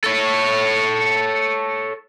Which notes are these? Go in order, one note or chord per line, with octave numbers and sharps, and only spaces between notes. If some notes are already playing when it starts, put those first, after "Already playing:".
A4 C#5